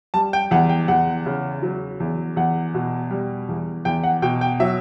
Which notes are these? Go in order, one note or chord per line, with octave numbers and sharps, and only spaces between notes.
G3 A5
G5
E2 F#5
G5
E2 F#5
C#3
F#3
E2
E2 F#5
B2
G3
E2
E2 G5
F#5
B2 G5
G5
F#3 E5